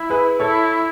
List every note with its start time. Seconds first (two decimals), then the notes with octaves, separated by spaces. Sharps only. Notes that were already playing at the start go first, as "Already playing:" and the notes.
Already playing: E4
0.10 G#4 B4
0.40 E4 A4 C#5